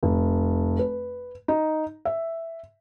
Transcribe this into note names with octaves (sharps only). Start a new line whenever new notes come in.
F1
B4
D#4
E5